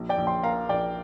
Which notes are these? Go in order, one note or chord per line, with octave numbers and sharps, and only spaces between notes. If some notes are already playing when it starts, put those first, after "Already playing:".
Already playing: A#1
D5 G5
A#1
G5 C6
A#3 F5 A#5
A#1 D5 G5